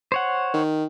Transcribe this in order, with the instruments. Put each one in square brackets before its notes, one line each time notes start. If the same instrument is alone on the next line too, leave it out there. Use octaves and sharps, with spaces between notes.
[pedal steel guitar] C5 C#5 F#5
[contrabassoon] D#3